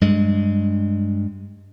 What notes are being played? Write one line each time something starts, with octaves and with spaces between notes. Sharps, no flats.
G2 G#3